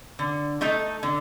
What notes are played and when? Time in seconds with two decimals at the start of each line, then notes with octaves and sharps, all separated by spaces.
0.19 D3
0.61 A3 D#4 A4
1.03 D3